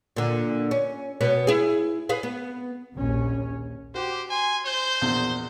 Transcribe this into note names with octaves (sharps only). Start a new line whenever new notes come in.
A#2 D3
C#4
B2 B3 C#4
E4 G#4
G#4 B4 F5
B3
A#1 D#2 C#4
F#4 G4 C5
G#5 C6
C5 G6
A#1 E2 B2